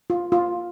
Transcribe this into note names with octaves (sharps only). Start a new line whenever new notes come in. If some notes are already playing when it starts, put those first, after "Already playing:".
F4
F4